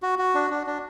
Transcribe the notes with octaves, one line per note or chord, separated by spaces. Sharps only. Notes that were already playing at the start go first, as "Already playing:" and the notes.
F#4
F#4
D4
D4
D4